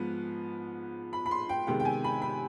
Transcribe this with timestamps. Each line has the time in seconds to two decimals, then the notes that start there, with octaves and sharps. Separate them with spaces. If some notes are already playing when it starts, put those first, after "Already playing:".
Already playing: G#2 F3 B3
1.13 B5
1.26 B5
1.31 C6
1.49 G5
1.67 C3 D#3 G#3 B3 G5
1.80 G5
1.85 G#5
2.04 B5
2.22 B5